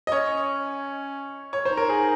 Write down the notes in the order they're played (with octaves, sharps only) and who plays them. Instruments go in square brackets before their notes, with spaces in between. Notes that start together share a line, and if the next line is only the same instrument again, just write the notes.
[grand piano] D#5
[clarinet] C#4 [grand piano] C#5
[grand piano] C#5
[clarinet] D#4 [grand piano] C5
[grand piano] A#4
G#4